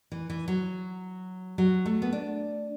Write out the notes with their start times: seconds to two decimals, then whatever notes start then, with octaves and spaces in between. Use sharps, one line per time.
0.12 E3
0.30 E3
0.48 F#3
1.58 F#3
1.86 A3
2.02 B3
2.13 D4